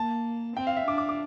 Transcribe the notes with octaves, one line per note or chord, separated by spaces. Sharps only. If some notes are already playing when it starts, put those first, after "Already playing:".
Already playing: A#3 A5
C4 G5
F5
E5
D4 D6
D6
D6